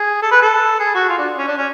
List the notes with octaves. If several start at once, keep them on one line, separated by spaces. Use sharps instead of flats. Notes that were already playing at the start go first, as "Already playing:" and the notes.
Already playing: G#4
A4
B4
A4
G#4
F#4
F4
D4
C#4
D4
C#4